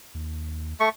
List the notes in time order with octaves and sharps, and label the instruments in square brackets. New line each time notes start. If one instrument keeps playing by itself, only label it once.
[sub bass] D#2
[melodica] A3 C#6